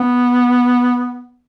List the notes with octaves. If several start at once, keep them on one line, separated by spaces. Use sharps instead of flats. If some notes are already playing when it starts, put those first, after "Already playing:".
Already playing: B3